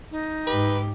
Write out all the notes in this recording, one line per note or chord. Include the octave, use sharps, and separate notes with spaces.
D#4
G#2 G4 B4